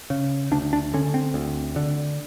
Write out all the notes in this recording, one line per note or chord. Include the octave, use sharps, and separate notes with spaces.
C#3
D2 D4
D4
D3 C#4
C4
D2
D3